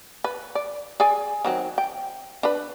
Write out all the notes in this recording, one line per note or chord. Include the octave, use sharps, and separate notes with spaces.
B4
D5
G#4 D5 G#5
D#3 F#3 C4
G5
D4 B4